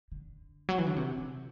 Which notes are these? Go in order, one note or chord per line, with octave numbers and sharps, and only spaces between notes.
D3
F#3
E3
D3
C3
C3